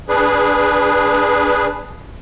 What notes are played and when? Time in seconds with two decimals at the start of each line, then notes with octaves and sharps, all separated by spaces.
0.08 D4 G#4 B4